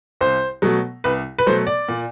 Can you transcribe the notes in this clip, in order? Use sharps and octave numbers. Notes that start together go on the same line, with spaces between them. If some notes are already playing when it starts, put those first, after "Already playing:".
C2 C5
B2 F#3 A3
C2 B4
B4
B2 F#3 A3 C5
D5
A#2